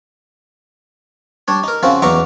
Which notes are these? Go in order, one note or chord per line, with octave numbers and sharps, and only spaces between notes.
G3 D4 C#5
D#4 A#4
C#3 F3 C4 F#4
E2 F#3 D#4 A#5 C#6 D6